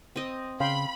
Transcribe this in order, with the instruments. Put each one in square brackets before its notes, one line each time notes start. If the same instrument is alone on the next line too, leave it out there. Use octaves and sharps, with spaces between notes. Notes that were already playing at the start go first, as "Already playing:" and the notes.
[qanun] C4 D#5
[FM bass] C#3 [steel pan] F5 G5 C6 [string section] B5